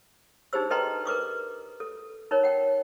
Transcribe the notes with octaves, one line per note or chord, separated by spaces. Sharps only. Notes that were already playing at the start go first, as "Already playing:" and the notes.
D4 D#4 G4 G#4 C5 E6
A4 B4 D#5 G5 A#5 C6
A#4 B4 D6 D#6
A4
D#4 A#4 C#5
F#5 G5